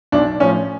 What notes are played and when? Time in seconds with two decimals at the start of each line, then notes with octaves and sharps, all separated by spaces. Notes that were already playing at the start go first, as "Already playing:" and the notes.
0.12 B1 D4
0.40 A2 F3 C#4